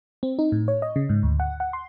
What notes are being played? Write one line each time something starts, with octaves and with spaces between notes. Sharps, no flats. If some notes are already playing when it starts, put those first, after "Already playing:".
C4
D#4
A2
C#5
D#5
C#3
G#2
D2
F#5
F#5
C6